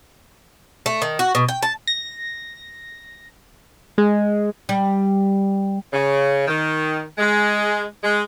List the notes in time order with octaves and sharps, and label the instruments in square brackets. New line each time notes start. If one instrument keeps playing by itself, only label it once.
[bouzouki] A3
D#3
F#4
B2
G5
A5
[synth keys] A#6
G#3
[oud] G3
[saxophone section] C#3
D#3
G#3
G#3